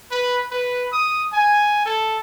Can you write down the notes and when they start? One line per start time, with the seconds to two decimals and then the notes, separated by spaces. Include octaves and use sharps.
0.11 B4
0.51 B4
0.92 D#6
1.33 G#5
1.86 A4